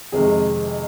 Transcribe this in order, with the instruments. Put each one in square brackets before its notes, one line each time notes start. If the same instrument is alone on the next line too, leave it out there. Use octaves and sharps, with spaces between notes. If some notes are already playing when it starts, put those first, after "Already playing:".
[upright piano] F2 C3 D#3 G#3 [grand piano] G#4